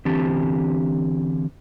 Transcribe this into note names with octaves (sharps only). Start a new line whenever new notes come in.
D3 E3 C4 G4 A5